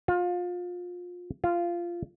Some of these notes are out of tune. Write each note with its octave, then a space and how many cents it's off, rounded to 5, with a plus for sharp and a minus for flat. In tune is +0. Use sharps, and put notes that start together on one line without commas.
F4 +25
F4 -15